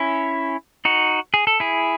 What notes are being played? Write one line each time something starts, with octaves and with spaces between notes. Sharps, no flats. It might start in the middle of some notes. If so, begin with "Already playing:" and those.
Already playing: C#4 E4
D#4 F#4
G#4
A4
E4 G#4